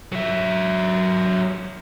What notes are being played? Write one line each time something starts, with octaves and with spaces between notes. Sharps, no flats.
F#3 E5